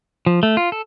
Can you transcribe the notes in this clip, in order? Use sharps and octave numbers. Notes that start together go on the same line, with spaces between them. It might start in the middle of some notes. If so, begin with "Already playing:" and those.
F3
A3
F4
A4